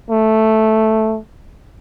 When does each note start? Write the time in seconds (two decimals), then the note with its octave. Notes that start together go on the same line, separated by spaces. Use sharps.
0.10 A3